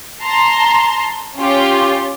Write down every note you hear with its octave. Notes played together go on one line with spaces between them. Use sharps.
A5 A#5 C6
C#4 F4 G4